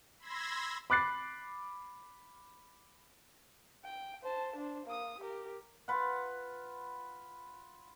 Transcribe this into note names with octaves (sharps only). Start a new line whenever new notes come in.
B5 C6 E6 G#6 A#6
B5 D6 F#6 A6 C7
G5
C5 A5
D4 C5
A#3 D#6
G4 A#4
F4 B4 F#5